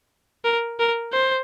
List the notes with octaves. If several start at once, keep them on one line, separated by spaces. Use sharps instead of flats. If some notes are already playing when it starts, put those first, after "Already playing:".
A#4
A#4
C5